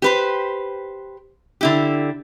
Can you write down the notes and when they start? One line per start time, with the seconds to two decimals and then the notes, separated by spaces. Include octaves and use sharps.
0.02 G4 B4 C5
1.61 D3 E4 G4